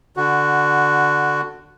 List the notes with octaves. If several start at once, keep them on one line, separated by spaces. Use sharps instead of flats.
D3 F#4